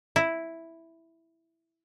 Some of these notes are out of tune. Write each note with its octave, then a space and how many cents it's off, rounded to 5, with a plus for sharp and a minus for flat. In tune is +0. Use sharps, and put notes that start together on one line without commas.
E4 +0